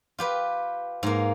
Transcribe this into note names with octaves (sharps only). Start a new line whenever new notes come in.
F4 G4 B4
G#2 A#3